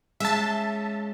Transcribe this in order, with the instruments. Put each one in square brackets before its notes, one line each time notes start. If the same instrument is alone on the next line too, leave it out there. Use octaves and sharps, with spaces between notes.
[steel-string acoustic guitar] G#3 C#4 F4 [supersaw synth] E5 A5